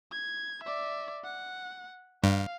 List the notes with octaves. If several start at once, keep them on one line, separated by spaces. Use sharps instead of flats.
G#6
D5 E5
F#5
G2 F5